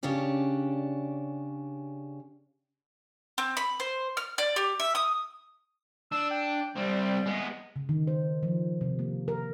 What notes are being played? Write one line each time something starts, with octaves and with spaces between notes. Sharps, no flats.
C#3 C#4 D4 G4 D5
C4
B5
C5
F6
D5
G4
E5
D#6
D4 E6
G5
C2 G3 C4
G#3 B3
C#3
D#3
C5
F3
C3
A#3
A#4